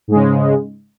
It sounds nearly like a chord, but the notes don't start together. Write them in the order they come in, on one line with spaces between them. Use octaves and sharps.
G#2 G#3 C#3